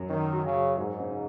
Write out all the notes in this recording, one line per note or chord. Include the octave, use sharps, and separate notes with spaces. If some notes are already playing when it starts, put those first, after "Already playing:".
Already playing: F#2 F#3 F#4
D#3 C#4
F#4
C#3
F#3
G#2 F#4
C#3